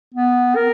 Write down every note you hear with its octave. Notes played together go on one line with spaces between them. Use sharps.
B3
A#4